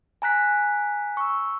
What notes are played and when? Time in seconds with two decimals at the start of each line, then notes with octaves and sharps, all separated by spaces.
0.22 G#5 A#5 F#6 B6
1.17 C#6 E6